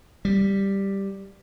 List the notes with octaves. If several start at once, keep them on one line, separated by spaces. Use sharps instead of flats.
G3